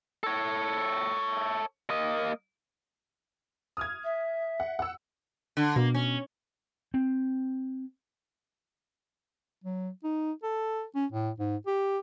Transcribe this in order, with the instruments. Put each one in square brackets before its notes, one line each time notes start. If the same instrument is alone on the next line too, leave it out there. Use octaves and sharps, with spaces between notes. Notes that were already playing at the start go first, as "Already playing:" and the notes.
[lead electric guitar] A4 C#5
A#3 D#5
[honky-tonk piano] D#6 F6 G#6
[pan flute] E5
[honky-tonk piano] F#5
F#5 E6
[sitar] D3
[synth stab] B2 [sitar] A#3
[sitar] C#4
[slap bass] C4
[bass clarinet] F#3
D#4
A4
C#4
A2
G#2
G4